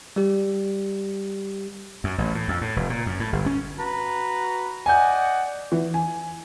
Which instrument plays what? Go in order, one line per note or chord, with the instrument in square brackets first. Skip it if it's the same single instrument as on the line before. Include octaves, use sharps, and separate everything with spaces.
[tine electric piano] G3 G4
[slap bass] F#2
A1
A2
F2
A2
F1
A#2
F#2
A2
G1
C#4
[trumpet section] F#4 B4 A#5
[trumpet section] D5 D#5 F#5 [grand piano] G#5 G6
[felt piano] E3
G#5